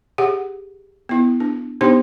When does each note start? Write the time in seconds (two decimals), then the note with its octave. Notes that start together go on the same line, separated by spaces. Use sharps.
0.18 G4 G#4 F#5
1.09 B3 E4
1.40 D4
1.81 B3 D4 D#4 G4 C5 C6